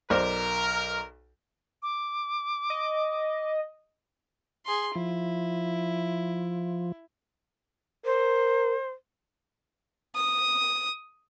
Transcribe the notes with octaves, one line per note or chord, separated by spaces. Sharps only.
B1 A#4 C5 D5
D6
D#5
G#4 C6
F3 E4
A#4 C5
D#6